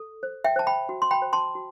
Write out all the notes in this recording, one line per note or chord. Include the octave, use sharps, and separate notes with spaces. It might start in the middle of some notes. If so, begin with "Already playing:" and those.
Already playing: A4
C5
E5 G5
C5 A5
G5 B5
F#4
C6
G5 B5
C5
A5 C6
F#4